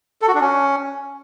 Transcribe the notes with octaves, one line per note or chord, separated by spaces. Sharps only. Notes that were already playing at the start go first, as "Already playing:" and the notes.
A4
F#4
D4
C#4